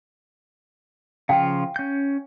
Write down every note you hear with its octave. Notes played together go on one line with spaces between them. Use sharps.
C#3 F3 F4 F5 G5
C#4 G6